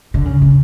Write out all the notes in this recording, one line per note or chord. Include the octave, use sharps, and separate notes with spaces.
D3
C#3
C#3